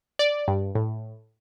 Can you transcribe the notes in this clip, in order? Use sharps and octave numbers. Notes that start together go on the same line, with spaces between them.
D5
G2
A2